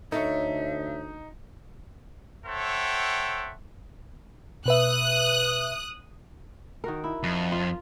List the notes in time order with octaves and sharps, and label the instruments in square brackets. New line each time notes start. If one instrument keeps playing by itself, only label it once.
[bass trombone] D2 [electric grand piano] D#4 [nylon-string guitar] A4 C#5 [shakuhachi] E5
[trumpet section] A4 C5 C#5 E5 F#5 G5
[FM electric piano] B2 B4 E5 [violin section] D#6 F#6
[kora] D#3 F#4 A#4
E4
[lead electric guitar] F2
[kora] F4